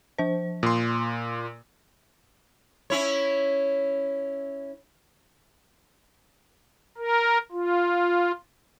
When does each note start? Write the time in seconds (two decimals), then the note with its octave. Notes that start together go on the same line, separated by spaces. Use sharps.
0.18 F3 C5
0.63 A#2 C6 D#6
2.90 C#4 E4 C#5
6.98 A#4
7.52 F4